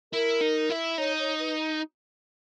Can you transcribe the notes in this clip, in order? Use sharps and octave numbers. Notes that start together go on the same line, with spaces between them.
E4 A#4
D#4
E4
D#4 C#5
C#5
B4